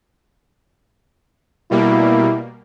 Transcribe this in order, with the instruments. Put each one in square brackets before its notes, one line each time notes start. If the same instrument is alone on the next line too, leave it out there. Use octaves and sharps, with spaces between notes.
[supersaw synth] B2 G3 A#3 [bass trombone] E4